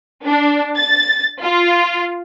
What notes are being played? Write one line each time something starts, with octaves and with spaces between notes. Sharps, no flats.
D4
A6
F4